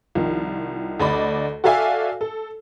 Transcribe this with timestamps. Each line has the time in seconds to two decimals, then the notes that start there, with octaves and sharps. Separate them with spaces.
0.15 C2 D#3 F3
1.00 D2 D5 D#5 B5
1.64 F#4 A4 D5 E5 F5 G#5
2.21 A4